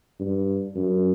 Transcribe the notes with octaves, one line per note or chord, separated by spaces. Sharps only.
G2
F#2